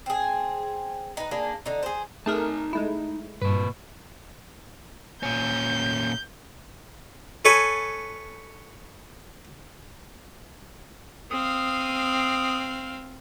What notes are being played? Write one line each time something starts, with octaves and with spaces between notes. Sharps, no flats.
C4 G#4
D#4 B4
A#3 D4 G#4
D3 D#4
G#4 C5
A3 D#4 G#4 A#4 A5
G#3 A3 E4
G2 A#2 B4
A#2 C#4 G6
A4 B4 C#5 G#5 A5
C4 F5 D#6